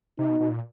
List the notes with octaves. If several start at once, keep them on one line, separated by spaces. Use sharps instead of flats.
C3 D#4
B2
B2
A#2